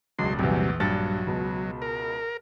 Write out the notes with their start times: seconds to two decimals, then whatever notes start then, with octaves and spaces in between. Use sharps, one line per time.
0.19 E1 C#2 F#3 C6
0.39 A#1 E2 C3 F#3 G3
0.80 A#1 G2 F#3 A6
1.27 C#2 B2
1.82 A#4